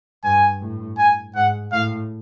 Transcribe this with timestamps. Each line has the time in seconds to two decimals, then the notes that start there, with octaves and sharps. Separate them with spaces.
0.24 G2 G#5
0.61 A2
0.98 G#5
1.35 G#2 F#5
1.72 A2 F5